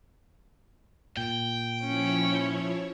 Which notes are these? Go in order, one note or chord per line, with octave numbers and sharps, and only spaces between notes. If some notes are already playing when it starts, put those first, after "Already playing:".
A#2 G5
F3 C#4 E4 C#5